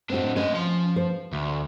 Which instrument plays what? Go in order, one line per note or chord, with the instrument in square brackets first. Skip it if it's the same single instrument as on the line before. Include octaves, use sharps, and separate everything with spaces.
[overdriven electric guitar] A2 D4 [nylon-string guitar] C4 F#4
[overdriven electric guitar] A3 D#5 [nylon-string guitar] C#4
[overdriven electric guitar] F3 C6
[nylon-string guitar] C5
[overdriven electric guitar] D2